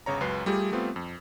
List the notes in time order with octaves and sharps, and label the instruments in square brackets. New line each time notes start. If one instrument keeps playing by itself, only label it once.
[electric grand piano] G1 C#3 C#5 A#5
C#2 F#2 B4 C7
G3 A3 F4 G4 G#4
G3 A3 B3 C4 F4
F2